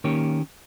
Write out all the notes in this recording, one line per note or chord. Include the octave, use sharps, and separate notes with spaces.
D#3 A#3 C#4 G4 C#5